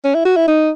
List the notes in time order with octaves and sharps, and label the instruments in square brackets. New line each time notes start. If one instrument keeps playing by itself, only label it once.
[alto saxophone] C#4
E4
F#4
E4
D#4